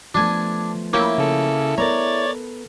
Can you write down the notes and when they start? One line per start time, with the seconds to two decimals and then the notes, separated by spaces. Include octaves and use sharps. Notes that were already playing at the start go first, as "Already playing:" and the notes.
0.15 F3 A3 B3 D4 G#5
0.93 A#3 C#4 E4 G5
1.18 C#3 A4
1.78 B3 A4 A#4 C#5 D5 A#5 A6